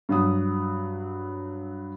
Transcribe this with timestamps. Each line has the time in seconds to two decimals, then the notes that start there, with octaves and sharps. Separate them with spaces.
0.09 G2 F#3 D#6